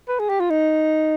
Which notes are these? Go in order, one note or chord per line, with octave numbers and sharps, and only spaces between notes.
B4
G#4
G4
F4
D#4